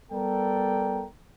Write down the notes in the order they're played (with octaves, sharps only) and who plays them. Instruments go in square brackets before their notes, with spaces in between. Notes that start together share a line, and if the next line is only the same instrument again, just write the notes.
[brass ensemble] G3 B3 A4 A#4 D5 G5